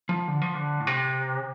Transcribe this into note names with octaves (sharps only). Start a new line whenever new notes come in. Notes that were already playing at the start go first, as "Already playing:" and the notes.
F3
D3
F3
D3
A2
C3